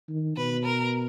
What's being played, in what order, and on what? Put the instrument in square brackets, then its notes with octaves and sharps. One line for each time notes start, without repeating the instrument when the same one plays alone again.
[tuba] D#3
[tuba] B2 [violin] B4
[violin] A#4